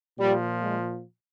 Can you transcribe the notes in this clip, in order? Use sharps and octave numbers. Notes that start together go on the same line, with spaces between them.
A#2 F3 G3
G#3